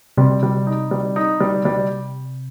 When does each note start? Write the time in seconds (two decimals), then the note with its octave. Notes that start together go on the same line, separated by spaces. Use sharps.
0.17 C3 G3
0.43 G3
0.67 D#4
0.91 G3
1.16 D#4
1.40 G3
1.65 G3